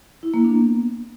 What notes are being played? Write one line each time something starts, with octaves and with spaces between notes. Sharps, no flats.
E4
A#3
D4
B3